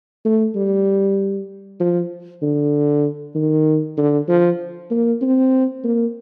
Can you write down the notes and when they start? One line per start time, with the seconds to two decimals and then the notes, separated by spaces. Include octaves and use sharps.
0.25 A3
0.56 G3
1.80 F3
2.42 D3
3.35 D#3
3.97 D3
4.28 F3
4.91 A#3
5.22 C4
5.84 A#3